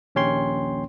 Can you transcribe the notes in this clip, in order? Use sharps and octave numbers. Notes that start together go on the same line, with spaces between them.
A#1 D#2 C#4 C#5 G5 C6